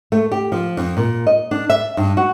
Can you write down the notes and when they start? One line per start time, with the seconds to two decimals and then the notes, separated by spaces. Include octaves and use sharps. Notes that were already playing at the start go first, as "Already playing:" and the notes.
0.12 A3
0.32 G4
0.52 F3
0.77 F2
0.97 A#2
1.27 D#5
1.51 D4
1.69 E5
1.97 G2
2.17 F#4